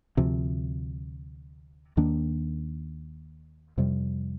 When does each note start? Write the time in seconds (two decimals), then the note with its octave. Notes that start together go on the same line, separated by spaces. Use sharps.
0.17 D2 C3 F3
1.97 D#2 D#3 A#3 D4
3.78 F2 C3 G3